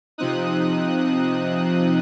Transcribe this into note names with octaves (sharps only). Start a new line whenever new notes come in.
C3 F3 C4 D#4 D#6 F#6